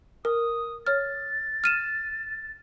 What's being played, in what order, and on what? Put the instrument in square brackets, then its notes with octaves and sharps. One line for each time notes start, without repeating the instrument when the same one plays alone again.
[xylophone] A#4 [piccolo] D#6
[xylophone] C#5 F6 [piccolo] A6
[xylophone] F6 D#7 E7